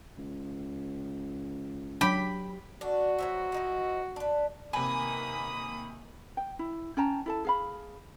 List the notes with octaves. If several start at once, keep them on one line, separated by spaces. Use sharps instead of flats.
C#2
F#3 D4 G4 B5
A3 D4 F#4
F#3 C5 E5
F3 D#4 E4
D4 B4
C3 D#3 A#3 B4 G#5 B5 D#6
G5
E4
C#4 G5 A5 A#5
E4 A4 A5
G#4 F5 B5